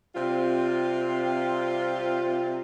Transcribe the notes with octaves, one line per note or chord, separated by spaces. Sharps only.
C3 G3 C4 F4